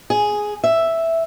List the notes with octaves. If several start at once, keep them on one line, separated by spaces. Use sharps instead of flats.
G#4
E5